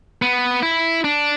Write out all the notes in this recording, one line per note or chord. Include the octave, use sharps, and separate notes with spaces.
B3
E4
D4